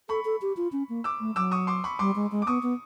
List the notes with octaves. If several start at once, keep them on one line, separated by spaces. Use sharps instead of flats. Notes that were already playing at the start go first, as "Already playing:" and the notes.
A4 B5 C#6
A4
G4
F4
C#4
A#3
D6 E6
A3
F#3 D6 E6
C#6 D#6
C6 D6
B5 C#6
G3 C6 D6
G#3
G#3
D6
B3 C#6 D#6
B3